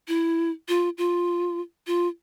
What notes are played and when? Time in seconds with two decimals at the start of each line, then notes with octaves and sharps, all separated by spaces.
0.08 E4
0.68 F4
0.98 F4
1.87 F4